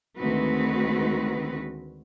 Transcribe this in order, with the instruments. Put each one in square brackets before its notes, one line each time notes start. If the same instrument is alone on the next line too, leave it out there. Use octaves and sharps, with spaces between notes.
[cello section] D2 D#3 G#3 C4 F#4 B4